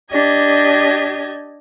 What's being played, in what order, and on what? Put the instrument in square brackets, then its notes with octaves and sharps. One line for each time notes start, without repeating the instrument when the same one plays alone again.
[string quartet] D4 G4 D#5 G#6